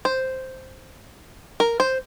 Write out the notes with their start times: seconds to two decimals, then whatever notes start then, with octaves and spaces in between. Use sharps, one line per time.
0.05 C5
1.60 A#4
1.80 C5